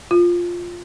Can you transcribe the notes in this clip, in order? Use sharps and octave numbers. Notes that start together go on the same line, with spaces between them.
F4